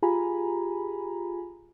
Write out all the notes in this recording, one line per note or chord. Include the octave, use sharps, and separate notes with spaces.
F4 G4 G#4 G#5 A#5 B5